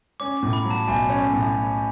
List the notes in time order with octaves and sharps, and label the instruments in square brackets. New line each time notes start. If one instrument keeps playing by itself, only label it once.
[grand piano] C#4 [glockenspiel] D6
[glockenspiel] D6
[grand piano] A2
[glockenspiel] B5
[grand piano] F#3
[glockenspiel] A5
[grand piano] B1 [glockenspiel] G#5
[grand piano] C#4
A2